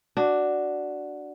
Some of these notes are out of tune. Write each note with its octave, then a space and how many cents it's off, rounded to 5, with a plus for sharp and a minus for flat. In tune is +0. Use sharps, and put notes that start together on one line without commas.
D4 +0 F#4 +0